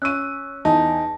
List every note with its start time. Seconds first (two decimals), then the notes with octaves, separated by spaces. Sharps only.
0.02 C#4 C#6 E6 F#6 D#7
0.65 E2 D#4 A5